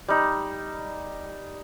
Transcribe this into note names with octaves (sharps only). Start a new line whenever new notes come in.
G3 D#4